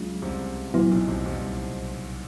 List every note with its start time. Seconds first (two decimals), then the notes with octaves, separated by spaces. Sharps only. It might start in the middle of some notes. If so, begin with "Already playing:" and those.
Already playing: C#2 C#3 F#3 A3 D4 F4
0.22 C2 C3
0.74 A#2 F#3 B3 E4
0.91 B1 B2
1.08 C2 C3
1.25 C2 C3